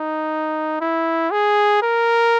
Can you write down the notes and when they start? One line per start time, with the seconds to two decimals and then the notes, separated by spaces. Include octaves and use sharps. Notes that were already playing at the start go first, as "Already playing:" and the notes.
Already playing: D#4
0.81 E4
1.31 G#4
1.82 A#4